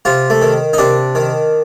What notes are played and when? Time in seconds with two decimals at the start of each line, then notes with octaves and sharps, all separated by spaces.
0.05 C3 F4
0.30 A3
0.42 D#3
0.73 D#4
0.78 C3 D4
1.15 D#3